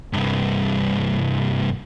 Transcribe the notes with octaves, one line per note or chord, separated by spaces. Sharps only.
C2 G2